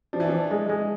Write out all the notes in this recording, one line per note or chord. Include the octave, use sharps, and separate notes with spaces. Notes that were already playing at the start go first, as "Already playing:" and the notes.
F3 D4
E3
F3 D4
G#3
G#3